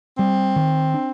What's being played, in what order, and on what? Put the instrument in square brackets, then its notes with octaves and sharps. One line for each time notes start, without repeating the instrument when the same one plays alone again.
[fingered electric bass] G3 [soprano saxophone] C4
[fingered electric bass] D#3
D4